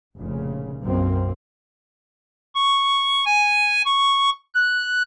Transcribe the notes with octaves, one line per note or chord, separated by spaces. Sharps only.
F1 A#2 C#3
B1 F#2 A#3 C4
C#6
G#5
C#6
F#6